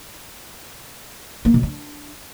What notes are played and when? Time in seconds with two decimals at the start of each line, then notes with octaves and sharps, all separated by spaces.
1.45 A#3
1.54 B2
1.63 D4